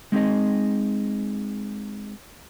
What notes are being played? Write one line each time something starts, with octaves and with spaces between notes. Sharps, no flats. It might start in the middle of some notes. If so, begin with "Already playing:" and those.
G#3 C4 D#4 G#4 D#5